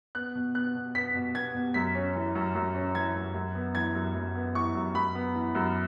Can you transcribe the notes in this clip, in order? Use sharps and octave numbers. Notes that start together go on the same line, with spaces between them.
B3 F#6
B2
B3 F#6
B2
B3 B6
B2
B3 G#6
B2
F#2 B6
C#4
E3
F#2
F#2
C#4
E3 G#6
F#2
F#2
B3
E3 G#6
F#2
F#2
B3
E3 C#6
F#2
F#2 B5
B3
E3
F#2